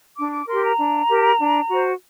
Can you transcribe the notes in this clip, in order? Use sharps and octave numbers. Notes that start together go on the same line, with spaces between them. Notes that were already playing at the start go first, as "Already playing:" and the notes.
D4 D6
D6
G4 A#4 C6
A#5
D4
G4 A#4
D4
F#4 C5